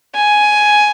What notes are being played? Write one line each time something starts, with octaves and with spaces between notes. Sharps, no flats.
G#5